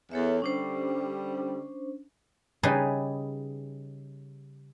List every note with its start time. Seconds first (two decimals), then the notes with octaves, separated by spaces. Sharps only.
0.12 E2 A4 C#5 E5
0.42 D3 G3 C#4 D4 C5
2.63 C#3 G3 D#4 G#4 B4